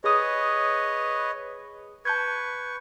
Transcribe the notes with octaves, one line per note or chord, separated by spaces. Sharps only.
G#4 B4 C#5 D#5 D#6
B4 A5 C#6 G6 G#6